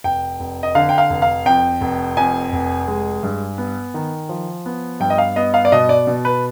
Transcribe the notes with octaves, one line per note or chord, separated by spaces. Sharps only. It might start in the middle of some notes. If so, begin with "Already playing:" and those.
F1 G5
F1
D#5
D3 F5
G5
F5
F1
F5
F2 G5
F1
F2 G#5
F1
G#3
G2
B3
D#3
F3
B3
G2 G5
D#5
F5
B3 D#5
F5
D5
B2 D#5
D5
B2
B4